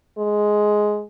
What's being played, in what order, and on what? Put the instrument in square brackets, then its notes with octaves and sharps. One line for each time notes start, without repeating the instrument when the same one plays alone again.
[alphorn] G#3